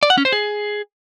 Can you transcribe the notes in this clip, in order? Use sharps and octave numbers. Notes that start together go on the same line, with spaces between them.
D5
F#5
C#4
C5
G#4